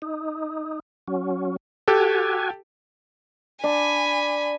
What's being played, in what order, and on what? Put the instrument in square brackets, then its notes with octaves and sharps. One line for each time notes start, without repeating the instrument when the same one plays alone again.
[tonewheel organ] D#4
F#3 C#4
[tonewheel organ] F#4 G#5 [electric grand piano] G4 A4
[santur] D4 [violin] G#5 B5